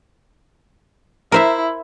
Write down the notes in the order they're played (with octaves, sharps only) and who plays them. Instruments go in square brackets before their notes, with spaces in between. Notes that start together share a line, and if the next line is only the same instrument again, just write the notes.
[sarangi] E4 [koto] A#4 C5 E5